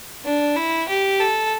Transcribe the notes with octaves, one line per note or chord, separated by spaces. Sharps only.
D4
E4
G4
A4